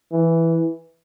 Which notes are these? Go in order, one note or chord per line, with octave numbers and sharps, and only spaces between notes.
E3